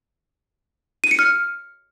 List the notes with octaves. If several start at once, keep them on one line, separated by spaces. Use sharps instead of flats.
D#7
C#7
F6